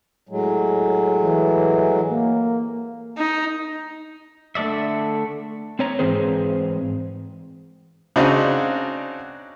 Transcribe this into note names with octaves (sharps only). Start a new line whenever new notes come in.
A2 F#3 G#3
E3
A#3
D#4
D3 A3 A4 D5 E5
C4 C#5 A#5
G#2 E3 C4 G#4 C5
C#3 C4 D4 D#4 F#4